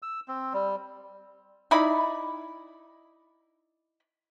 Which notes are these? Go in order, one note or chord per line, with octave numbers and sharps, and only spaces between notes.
E6
C4
G3
D#4 E4 D5 B5